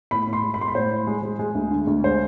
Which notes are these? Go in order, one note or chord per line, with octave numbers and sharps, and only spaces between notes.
A2 B5
A2
C6
G#3
B5
G#3 C6
B5
A2 C5
A2
G#3
G#3
G#3
D2
D3
D2
G#3 C5